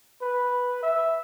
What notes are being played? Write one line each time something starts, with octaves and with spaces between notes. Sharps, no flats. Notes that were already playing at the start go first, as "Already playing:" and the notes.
B4
E5